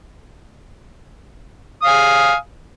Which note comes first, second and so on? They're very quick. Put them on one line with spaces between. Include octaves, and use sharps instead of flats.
D#6 F5 G#5